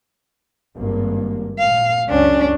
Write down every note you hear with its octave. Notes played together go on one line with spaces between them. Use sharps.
G#1 G2 A#3
A#2 F5
C#2 F#2 C#4 D4